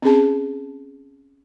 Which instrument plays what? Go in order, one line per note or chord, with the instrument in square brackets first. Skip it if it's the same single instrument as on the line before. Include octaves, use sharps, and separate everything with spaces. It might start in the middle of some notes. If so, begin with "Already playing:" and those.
[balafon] C4 C#4 G#4 A5